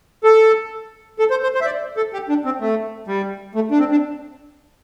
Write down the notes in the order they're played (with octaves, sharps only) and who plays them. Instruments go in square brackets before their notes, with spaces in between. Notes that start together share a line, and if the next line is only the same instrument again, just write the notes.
[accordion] A4
A4
C5
C5
C5
E5
D5
A4
G4
D4
C4
A3
G3
A3
D4
C4
D4